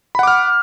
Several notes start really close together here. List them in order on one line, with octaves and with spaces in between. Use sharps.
B5 F#5 D6 F6